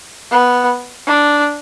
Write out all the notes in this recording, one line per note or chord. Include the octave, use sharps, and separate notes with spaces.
B3
D4